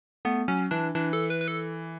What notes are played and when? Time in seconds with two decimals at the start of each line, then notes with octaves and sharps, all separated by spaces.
0.25 A3 B3
0.48 F#3 C#4
0.71 E3 D4
0.95 E3 D4
1.13 A4
1.30 B4
1.41 B4
1.48 A4